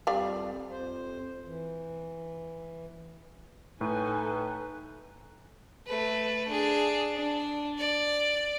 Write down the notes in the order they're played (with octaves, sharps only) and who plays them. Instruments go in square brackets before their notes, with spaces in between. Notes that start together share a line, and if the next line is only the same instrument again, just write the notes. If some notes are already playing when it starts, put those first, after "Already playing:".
[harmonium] F2 G3 [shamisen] G4 D5 F5
[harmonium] F2 C5
E3
[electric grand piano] A2 [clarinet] D#4 [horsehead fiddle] A4 G#5 [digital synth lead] B4
[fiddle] A3 B4
D4 G#4
D4
D5